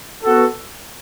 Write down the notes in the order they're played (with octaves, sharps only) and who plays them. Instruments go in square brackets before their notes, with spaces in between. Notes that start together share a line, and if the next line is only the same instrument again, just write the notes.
[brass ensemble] B3 F#4 A4